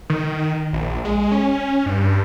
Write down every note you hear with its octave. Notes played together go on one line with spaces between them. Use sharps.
D#3
A#1
G#3
C#4
G2